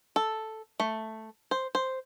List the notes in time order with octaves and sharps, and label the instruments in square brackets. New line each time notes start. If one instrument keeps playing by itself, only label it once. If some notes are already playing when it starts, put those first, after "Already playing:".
[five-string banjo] A4
A3
C5
C5